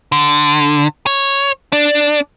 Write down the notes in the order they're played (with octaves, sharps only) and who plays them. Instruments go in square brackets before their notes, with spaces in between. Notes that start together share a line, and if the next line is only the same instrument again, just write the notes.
[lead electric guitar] D3
C#5
D4